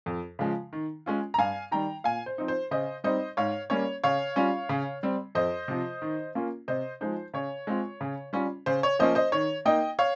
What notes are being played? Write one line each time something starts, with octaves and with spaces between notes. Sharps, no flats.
F2
C#3 F3 G#3
D#3
G#3 C#4 F4
A#5
G2 F5 G#5
D#3 G3 G5 A#5
A#2 F5 G#5
C5
F3 C4 D#4
C5
C#3 C5 D#5
G3 C4 D#4 C5 D#5
G#2 C#5 F5
G3 A#3 C#4 C#5
C#3 C#5 F5
G3 C#4 F4
C#3
G3 C4
F2 C5 D#5
C3 F3
D#3
A#3 C#4 F4
C3 C5 D#5
F3 G#3 D#4 C5
C#3 C#5
G#3 C4 F4
C#3
G3 C#4 F4
C#3 C5
C#5
F3 A#3 C#4 C5 D#5
C5 D#5
D#3 C#5
A#3 D#4 D#5 G5
C#5 F5